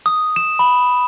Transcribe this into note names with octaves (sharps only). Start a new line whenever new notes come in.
D#6
E7
B5